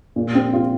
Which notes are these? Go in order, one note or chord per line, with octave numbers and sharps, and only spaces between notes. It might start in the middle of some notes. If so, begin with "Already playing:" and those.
A#2
C4
F4